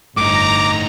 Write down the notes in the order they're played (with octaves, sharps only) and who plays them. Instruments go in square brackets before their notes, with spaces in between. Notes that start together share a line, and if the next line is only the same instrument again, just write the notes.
[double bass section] G1 F2 [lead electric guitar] A2 D#4 [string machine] A#5 [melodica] D6